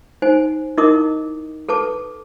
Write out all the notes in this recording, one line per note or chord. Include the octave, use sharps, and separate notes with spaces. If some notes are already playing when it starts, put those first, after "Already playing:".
D#4 C5 G#5
D#4 E4 A#4 D#5 D6 D#6
A4 B4 A5 D6